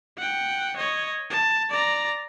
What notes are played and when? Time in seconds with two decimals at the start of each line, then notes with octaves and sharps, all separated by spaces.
0.18 F#5 G5
0.76 C#5 D#5
1.30 A5
1.69 D5 A#5